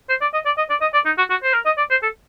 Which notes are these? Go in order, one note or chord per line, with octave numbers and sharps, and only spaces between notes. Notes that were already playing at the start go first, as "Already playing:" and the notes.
C5
D5
D#5
D5
D#5
D5
D#5
D5
D#4
F#4
F#4
C5
A#4
D#5
D5
C5
A4